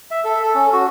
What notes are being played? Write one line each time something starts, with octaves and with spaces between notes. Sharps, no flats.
E5
A4
A4
C#4
F#4